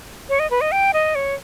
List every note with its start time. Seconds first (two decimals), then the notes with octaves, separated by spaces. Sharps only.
0.29 C#5
0.39 D#5
0.51 B4
0.61 D#5
0.72 G5
0.94 D#5
1.15 C#5